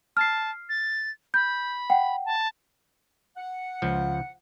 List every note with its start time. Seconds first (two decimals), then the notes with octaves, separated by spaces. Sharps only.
0.17 A5 F6 C7
0.69 A6
1.34 B5 G6
1.90 F#5 G5
2.25 A5
3.37 F#5
3.82 C#2 F3